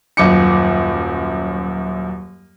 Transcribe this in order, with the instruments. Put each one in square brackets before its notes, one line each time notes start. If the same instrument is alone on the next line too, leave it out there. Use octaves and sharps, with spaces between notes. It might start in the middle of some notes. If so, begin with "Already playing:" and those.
[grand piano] D#1 F#2 D6 C#7